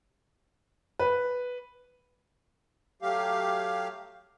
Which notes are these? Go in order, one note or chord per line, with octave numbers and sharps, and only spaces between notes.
B4
F#3 A3 G4 F5